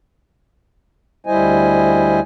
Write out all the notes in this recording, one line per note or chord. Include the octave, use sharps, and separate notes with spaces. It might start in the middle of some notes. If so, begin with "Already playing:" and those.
D2 G3 E4 C5 D#5 G#5